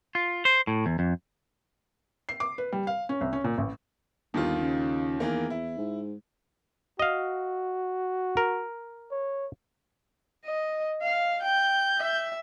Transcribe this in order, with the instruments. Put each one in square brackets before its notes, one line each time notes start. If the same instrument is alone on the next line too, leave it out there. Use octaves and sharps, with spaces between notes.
[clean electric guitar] F4
C5
A2
E2
F2
[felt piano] C7
D6
B4
G3
F5
C#4
C2
C#4
A#2
A1
[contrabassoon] G1 [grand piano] D#2 D#3 F4
[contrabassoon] C#3
[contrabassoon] E2 [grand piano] D#3 E3 A#3
[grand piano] E4
[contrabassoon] G#2
[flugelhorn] F#4 [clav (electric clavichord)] D#5 F5
[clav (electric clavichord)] A#4
[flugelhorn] C#5
[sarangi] D#5
F5
[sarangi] G5 [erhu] G6
[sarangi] E5